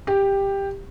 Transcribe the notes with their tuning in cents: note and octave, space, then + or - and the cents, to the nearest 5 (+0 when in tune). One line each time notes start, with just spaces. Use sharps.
G4 +10